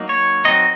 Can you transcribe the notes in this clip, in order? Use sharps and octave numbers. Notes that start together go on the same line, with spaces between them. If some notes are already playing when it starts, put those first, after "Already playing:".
Already playing: F#3 A#3 D#4
C#5
F#3 C4 D#4 D#5